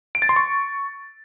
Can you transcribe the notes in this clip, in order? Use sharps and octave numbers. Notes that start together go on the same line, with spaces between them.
D7
A6
C6
C#6